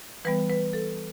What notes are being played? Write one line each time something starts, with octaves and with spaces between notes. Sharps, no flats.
E3 G3 B3 B4
B4
A4